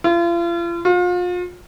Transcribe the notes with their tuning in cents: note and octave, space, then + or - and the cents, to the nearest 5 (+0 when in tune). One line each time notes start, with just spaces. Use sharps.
F4 -40
F4 +35